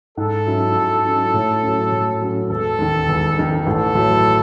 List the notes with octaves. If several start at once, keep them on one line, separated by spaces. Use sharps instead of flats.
G#2 A4
F#3 C#4 E4
G#2
F#3 C#4 E4
A2
F#3 C#4
A2
F#3 C#4
E1 A4
D#2 D#3
E1
D#2 D#3
A1 A4
A2 F#3